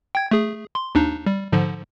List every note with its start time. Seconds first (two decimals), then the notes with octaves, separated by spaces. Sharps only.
0.15 G5 G#6
0.31 A3 G#4
0.75 C6
0.95 D#2 D4 D#4
1.26 G3
1.52 G#2 D3 F3